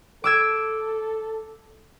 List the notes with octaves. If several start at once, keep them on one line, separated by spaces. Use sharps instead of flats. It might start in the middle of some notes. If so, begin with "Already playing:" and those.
A4 D6 E6 G#6